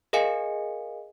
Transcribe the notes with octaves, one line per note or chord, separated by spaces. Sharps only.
G#4 A#4 D#5 F5 G#5 C#7